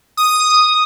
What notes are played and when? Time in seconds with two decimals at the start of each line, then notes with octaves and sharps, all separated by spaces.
0.17 D#6